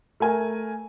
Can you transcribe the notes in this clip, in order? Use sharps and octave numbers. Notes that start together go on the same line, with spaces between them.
A3 A#4 G#5